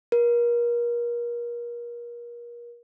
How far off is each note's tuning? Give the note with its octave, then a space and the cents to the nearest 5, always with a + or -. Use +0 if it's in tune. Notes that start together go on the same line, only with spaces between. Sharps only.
A#4 +35